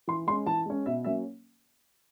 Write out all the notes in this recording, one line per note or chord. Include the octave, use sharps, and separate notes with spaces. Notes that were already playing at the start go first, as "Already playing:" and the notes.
E3 C6
G#3 C#4 C6
E3 A5
G#3 C#4
B2 E5
F#3 A#3 C#4 E5